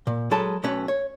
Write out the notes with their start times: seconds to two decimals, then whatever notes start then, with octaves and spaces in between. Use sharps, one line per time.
0.07 A#2
0.31 F#3 G#3 A4 B4 A5
0.64 B1 A3 C#4 B4 C#5
0.88 C#5